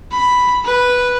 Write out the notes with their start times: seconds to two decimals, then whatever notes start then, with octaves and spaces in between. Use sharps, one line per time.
0.12 B5
0.65 B4